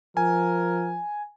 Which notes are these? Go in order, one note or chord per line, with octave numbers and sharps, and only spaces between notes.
F3 A#4 G#5